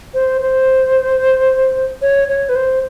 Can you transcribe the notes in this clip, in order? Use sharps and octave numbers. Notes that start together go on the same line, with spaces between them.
C5
C5
C#5
C#5
B4
C5